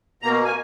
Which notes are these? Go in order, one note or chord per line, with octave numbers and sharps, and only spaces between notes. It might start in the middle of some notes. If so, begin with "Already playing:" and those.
B2 A#3 A#5
G#5